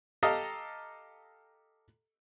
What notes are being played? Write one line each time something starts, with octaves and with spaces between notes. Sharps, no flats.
G4 A4 D#5 F5 A5 A#5